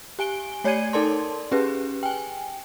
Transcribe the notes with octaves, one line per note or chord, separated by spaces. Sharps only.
G4 G#5 D7 G7
A3 C#5 D5 G#5 G#6 D#7
D#4 A4 A#4 D5 A5 C6
C#4 G4 G#4 B4
G5 G#5